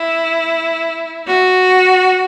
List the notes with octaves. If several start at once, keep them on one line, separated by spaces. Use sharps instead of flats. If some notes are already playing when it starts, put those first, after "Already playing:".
Already playing: E4
F#4